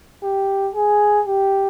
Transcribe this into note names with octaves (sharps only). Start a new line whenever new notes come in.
G4
G#4
G4